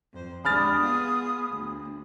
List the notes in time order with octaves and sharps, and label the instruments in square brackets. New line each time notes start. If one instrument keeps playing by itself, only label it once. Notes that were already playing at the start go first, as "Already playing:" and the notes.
[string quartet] F2 C5
[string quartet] G#3 D4 G4 [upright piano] B5 F6 A6 [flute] D#6
[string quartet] B3 F4 G#4
D2